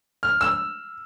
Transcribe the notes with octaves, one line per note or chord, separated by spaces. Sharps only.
F6
E6